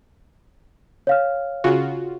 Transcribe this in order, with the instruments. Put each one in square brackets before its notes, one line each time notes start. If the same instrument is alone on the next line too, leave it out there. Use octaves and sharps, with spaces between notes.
[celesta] C#5 F5 F6
[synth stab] C#3 F4 F#4